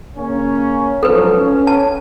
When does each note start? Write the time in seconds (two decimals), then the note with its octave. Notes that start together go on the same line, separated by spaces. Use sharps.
0.16 C#3 A#3 C#4
1.03 G#2 F3 F#3 A4 B4
1.36 C#4
1.67 A5